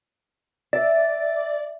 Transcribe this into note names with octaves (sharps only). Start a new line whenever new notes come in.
D5 E5